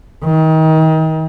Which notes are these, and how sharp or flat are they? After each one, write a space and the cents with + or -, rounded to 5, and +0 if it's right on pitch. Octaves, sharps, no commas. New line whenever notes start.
D#3 +30